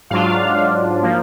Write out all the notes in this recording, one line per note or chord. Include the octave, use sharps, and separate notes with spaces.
G#2 F#3 D4 F4 F5
F3 A#3